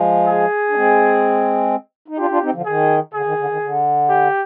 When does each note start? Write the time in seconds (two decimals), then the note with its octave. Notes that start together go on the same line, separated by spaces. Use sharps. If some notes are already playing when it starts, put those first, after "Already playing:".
Already playing: F3 G#3
0.27 G#4
0.70 D4
0.75 G#3 C4
2.08 D#4
2.18 D4 F4 G4
2.30 D4 F4
2.42 C4 D#4
2.53 D3 F3
2.65 D#3 G#4
3.14 D3 G#4
3.25 D#3
3.38 D3
3.49 D#3
3.61 D3
4.09 G4